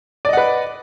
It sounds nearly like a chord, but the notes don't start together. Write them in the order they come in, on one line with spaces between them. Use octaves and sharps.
D5 D#5 F#5 B4